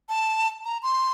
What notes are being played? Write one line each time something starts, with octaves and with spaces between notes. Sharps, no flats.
A5
A#5
C6